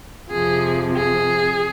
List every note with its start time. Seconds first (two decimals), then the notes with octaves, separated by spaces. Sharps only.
0.31 F2 C3 F3 G#4
0.96 G#4